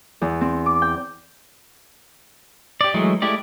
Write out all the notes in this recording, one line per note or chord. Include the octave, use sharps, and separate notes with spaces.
E2
C4
D6
G5
G4 D5
E3 F#3 G#3 A3
G#3 A3 E4 G4 D5